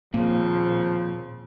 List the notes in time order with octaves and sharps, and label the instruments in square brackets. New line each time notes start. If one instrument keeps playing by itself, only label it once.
[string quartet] D#2 C#3 C4 [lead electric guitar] A#2 [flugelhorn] F3 [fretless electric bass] A#3